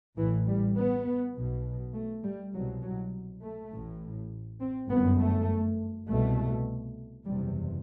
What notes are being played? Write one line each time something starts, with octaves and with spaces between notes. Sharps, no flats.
A1 A2 E3
G3
B3
B1 B2
A3
G3
C2 B2 F#3
F#3
A3
A1 A2
C4
G1 F#2 B3
A3
C2 B2 A3
F#1 E2 C3 G3